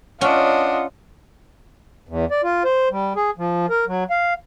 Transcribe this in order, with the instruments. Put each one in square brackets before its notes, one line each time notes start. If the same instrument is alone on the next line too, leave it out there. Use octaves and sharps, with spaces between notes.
[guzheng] C#4 [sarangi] D4 [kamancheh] F4 D#5 [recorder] F#5
[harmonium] E2
D5
F4
C5
G3
G#4
F3
A#4
F#3
F5